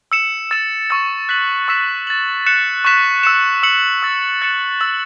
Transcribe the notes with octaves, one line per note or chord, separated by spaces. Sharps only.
E6 C#7 E7
E6 A6 E7
C#6 E6 A6
F#6 B6 F#7
C#6 E6 B6 E7
A6 F#7
F#6 C#7 E7
C#6 F#6 B6 E7
E6 C#7 E7
E6 C#7 F#7
C#6 E6 A6
F#6 A6 C#7 E7
E6 A6 F#7